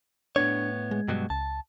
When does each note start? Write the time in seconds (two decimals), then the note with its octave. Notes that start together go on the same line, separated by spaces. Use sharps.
0.36 A2 B3 D4 C#5 G#6
0.91 G#3
1.08 G2 B2 F#3
1.30 C#2 A5